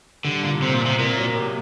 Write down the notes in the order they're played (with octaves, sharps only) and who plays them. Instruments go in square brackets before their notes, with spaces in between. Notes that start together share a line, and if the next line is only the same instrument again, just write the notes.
[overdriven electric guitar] D3 [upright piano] G3
[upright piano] A#2
[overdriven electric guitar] C3 [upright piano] C4
[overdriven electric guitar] A#2
[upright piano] C2
[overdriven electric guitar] C3
[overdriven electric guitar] A#2 [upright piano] A#3
[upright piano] F#3
C3